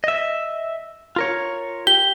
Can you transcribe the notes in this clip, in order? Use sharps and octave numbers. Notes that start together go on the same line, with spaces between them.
D#5 E5
F4 A#4 C#5
G4 G7